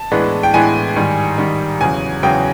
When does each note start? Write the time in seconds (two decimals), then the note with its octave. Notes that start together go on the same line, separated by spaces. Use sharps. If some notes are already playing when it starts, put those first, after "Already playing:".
Already playing: A5
0.11 A2 E3 G#3 B3 D4
0.43 G5
0.54 A2 E3 G#3 B3 D4 G#5
0.96 G#2 D#3 G3
1.38 G#2 D#3 G3
1.81 E2 C#3 F#3 G#5
2.23 E2 C#3 F#3 G5